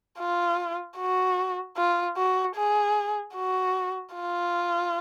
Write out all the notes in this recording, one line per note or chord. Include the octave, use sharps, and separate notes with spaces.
F4
F#4
F4
F#4
G#4
F#4
F4